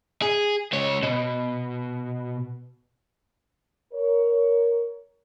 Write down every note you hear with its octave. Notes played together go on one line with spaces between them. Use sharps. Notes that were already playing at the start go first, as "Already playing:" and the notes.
G#4
C#2 C#5
B2
A#4 C#5